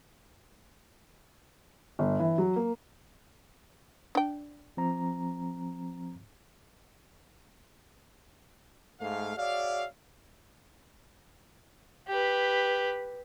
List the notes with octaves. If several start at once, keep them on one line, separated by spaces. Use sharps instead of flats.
G1
E3
F#3
A#3
D4 G5
F3 C4 A#5
G#2 A3 F5
F#4 G#4 C#5 D5 E5 F5
G4 B4